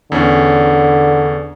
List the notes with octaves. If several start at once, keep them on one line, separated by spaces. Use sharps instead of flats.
E2 D3 C#4